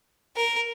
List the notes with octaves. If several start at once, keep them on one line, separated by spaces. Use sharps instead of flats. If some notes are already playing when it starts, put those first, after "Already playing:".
A#4